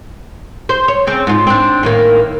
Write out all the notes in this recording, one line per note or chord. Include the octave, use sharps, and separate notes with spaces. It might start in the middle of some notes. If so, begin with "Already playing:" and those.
C5
C#5
C#3 C4
G#2 F4
C4 D4
A2 D#3 A#3